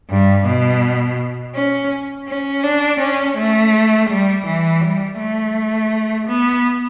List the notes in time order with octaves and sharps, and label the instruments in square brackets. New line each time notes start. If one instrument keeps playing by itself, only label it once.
[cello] G2
B2
C#4
C#4
D4
C#4
A3
G3
E3
G3
A3
B3